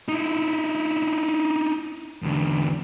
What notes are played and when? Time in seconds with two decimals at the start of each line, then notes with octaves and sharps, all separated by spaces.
0.08 D#4 E4
2.22 E2 D3